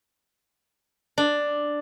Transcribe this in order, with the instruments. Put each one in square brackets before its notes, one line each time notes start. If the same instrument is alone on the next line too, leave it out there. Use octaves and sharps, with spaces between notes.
[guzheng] D4